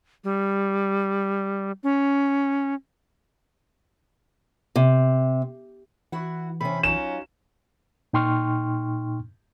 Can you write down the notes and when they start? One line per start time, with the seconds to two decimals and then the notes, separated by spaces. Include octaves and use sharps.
0.24 G3
1.83 C#4
4.76 C3
6.12 E3 E4 F#4 F#5
6.61 C3 C#4 B5
6.83 F#3 C#4 D#4 F4 E7
8.13 A#2 D#4 G5 C6 C#6 F6